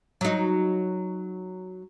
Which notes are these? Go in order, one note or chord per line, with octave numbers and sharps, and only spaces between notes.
F#3 D#4